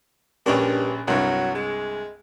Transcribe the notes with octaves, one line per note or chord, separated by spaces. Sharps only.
A#1 G2 C#4 D4
C2 G2 F#3
G#3